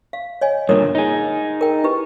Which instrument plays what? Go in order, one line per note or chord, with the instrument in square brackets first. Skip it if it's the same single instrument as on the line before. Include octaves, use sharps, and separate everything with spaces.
[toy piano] F5
C#5 D#5 G#5
[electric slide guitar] G2 A#2 D3 [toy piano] A#4 C#5 D#6
[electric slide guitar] D#4 G#4
[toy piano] A#4 G5
E4 G4 B4